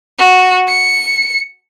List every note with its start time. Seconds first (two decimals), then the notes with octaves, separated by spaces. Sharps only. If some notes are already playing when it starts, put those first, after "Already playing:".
0.19 F#4
0.68 C#7